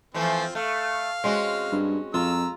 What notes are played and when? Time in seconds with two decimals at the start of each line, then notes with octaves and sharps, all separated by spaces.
0.14 E3 F3 A3 C4 F4
0.55 A3 F5
1.24 G#3 C4 C#4 F#4
1.72 G2
2.14 F2 F4 A#5 E6